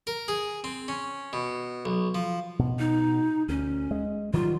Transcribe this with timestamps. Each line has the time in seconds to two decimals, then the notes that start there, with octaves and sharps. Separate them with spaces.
0.07 A#4
0.28 G#4
0.64 C4
0.88 C#4
1.33 B2
1.85 B1
2.15 F3
2.59 B2
2.79 D#4
3.49 D2 C#4
3.91 G#3
4.33 D#3 F#3 G3 F4